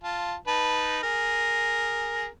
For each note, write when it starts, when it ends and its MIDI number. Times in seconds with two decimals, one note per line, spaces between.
0.03 0.35 65
0.03 0.35 81
0.47 0.99 63
0.47 0.99 71
0.47 0.99 81
1.03 2.27 68
1.03 2.27 70